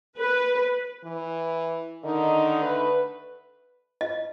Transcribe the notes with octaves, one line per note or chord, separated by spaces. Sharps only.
B4
E3
D3 D#3 D#4
A3 B4
D#5